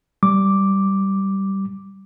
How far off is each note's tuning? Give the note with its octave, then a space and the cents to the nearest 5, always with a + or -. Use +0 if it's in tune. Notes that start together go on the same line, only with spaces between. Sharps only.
G3 -10 D6 +0